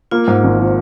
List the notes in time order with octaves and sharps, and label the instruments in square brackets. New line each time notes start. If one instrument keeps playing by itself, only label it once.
[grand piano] A#3 [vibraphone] F4
[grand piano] G#2
G#1
F3